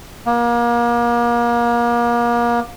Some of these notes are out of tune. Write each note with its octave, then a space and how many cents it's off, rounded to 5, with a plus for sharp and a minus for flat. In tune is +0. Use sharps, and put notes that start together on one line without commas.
A#3 +35